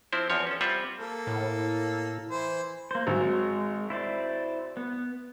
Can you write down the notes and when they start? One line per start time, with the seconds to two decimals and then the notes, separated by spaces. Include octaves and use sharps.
0.12 F3 C4 E4 C5
0.30 E2 F3 C#5
0.47 C#4 A4
0.61 G3 C4 F4 E5 F#5
0.99 A#3 A4
1.27 A2
2.30 E3 C5
2.91 A#3 C5
3.07 G#1 F#3 G#3
3.90 E4 C5 D5
4.77 B3